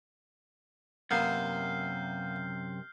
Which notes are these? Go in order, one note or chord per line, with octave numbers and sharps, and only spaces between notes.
F#2 C3 A#3 B3 F6 G6 C7